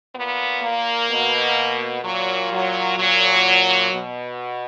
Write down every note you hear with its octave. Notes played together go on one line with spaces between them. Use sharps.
A#2 B3
A#3
B2
A#2 F#3
F#3
A#2 F#3
B2